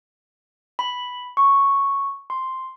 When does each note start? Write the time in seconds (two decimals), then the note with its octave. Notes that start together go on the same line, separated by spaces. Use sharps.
0.79 B5
1.37 C#6
2.30 C6